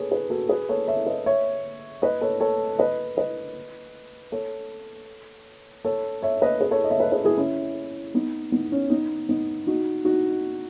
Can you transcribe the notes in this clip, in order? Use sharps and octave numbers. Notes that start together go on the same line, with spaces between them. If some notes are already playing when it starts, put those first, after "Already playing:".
Already playing: G#4 A4 B4 C#5
G#4 B4
F#4 A4
G#4 B4
A4 C#5
C#5 E5
B4 D#5
C#5 E5
B4 D#5
A4 C#5
A4 C#5
B4 D#5
B4 D#5
A4 C#5
A4 C#5
C#5 E5
B4 D#5
G#4 B4
A4 C#5
D#5
C#5 E5
B4 D#5
G#4 B4
E4 G#4
C#4 E4
B3 D#4
B3 D#4
C#4
B3 D#4
B3 D#4
D#4 F#4
D#4 F#4